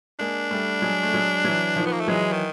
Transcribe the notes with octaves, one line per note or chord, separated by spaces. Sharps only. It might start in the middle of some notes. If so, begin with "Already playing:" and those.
G#3 A#3 D4
G3 A3
F#3 G#3
A3
F#3 G#3
E3 F#3
D#3 F3
B3
A#3
A3
E3 F#3 G#3
D#3